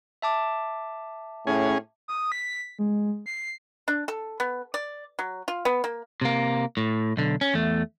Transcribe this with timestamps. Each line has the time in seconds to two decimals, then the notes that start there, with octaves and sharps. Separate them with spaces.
0.22 E5 A5 D6
1.47 A2 C#4 G#4
2.08 D#6
2.32 B6
2.79 G#3
3.26 C7
3.88 D4
4.08 A4
4.40 B3
4.74 D5
5.19 F#3
5.48 F4
5.65 B3
5.84 A#3
6.21 C3 A#3
6.77 A2
7.17 B1 D3
7.41 C#4
7.54 E2 A3